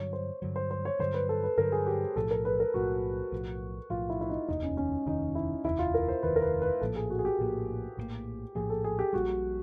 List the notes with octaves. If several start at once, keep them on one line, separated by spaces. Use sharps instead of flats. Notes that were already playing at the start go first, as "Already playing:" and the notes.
Already playing: G2 D3 F#3 C#5
C5
G2 D3 F#3
C5
C5
C#5
G2 D3 F#3 C5
B4
A4
B4
G2 D3 F#3 A#4
G#4
G4
B1 A2 F3 A4
A#4
B4
A#4
B1 A2 F3 F#4
B1 A2 F3
B1 A2 F3 F4
E4
E4
D#4
F1 D#2 D#3 D#4
C#4
C#4
F1 D#2 D#3 D#4
E4
F1 D#2 D#3 E4
F4
A#4
C5
F1 D#2 D#3 B4
A#4
B4
B4
A#1 A2 F3 A#3 A4
G#4
F#4
G#4
G4
A#1 A2 F3 A#3
A#1 A2 F3 A#3
A#1 A2 F3 A#3 G#4
A4
G#4
G4
A#1 A#2 G3 F#4